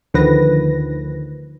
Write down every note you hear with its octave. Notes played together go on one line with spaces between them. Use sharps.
D2 D3 D#3 F3 B4 A#6